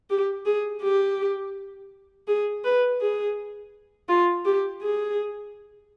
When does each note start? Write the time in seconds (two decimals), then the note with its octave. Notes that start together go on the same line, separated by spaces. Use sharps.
0.10 G4
0.46 G#4
0.82 G4
2.28 G#4
2.64 B4
3.01 G#4
4.09 F4
4.45 G4
4.82 G#4